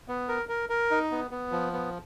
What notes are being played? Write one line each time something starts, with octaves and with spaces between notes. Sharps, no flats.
B3
A#4
A#4
A#4
D#4
B3
B3
F3
B3